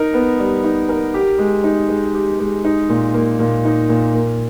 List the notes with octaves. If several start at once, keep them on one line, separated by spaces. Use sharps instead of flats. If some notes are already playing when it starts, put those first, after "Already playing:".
Already playing: D#4 A#4
B3
G3
D#4
A#4
G4
G#3
D#4
G#3
G4
G#3
D#4
A#2
A#3
A#2
D#4
A#2
A#3